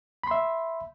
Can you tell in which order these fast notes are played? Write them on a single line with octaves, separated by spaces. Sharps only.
B5 C6 E5